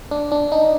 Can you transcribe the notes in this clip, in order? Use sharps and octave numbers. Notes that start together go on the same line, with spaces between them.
D4
D4
D#4